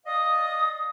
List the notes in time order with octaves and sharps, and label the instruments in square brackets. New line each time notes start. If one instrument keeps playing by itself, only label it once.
[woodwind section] D5 D#5 F5 D#6